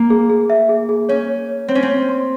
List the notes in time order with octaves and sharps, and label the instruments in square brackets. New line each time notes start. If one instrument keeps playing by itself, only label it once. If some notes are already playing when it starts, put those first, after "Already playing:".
Already playing: [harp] A#3
[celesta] G#4
G#4
E5
G#4
G#4
[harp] C#4 [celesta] C#5
[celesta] C#5
C#5
[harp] C4 [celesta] C#5
[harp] C#4
C4
[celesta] C#5
C6